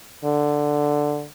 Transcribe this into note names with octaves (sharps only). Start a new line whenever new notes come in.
D3